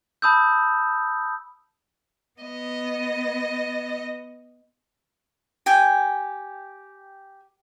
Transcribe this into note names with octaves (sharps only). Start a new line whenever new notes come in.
A5 B5 D#6 E6 G6
B3 D#5
G4 G5 G#5